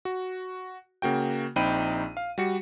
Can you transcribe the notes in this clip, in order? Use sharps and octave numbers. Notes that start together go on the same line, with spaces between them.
F#4
C#3 A#3 F#4 G5
A#1 C4 D#4 G5 B5 D#7
F5
G3 F#4 C#7